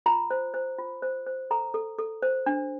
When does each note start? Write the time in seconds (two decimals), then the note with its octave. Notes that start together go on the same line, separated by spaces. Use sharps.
0.06 F4 A#5
0.31 C5
0.54 C5
0.78 F4
1.02 C5
1.26 C5
1.51 A4 A#5
1.74 A4
1.99 A4
2.22 C5
2.46 D4